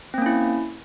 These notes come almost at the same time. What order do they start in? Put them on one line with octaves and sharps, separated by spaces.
C4 A#3 C#4 E4